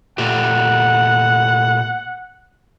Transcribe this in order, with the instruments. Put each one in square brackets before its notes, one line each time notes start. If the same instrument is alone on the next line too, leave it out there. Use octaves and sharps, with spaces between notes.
[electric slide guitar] A#2 A3 G4 [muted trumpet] F#5